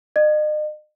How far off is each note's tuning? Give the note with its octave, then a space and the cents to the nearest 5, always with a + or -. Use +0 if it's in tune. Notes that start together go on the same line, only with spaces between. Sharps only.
D#5 -40